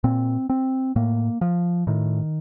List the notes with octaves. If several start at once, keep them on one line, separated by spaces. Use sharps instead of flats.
A#2 C4
C4
A2 A#3
F3
A2 D#3